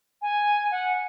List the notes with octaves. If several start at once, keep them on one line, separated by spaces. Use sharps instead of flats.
G#5
F#5